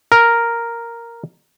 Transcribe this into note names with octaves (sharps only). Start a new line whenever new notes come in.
A#4